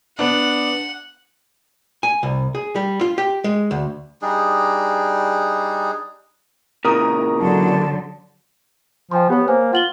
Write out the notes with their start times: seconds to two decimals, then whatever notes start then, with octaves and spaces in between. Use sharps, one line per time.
0.19 B3 D4 F#5
2.03 G#5
2.23 C2
2.55 G#4
2.76 G3
3.01 F4
3.18 G4
3.44 G#3
3.71 D2
4.22 G3 D4 D#4 G#4
6.85 A#2 C#3 E3 A#4 A#5 D#6
7.39 D3 F#3 A5
9.11 F3 G5 G#5 C6
9.30 B3 G4 C#5
9.48 A#3 C5 G#5
9.73 F4 F#5 F#7 G7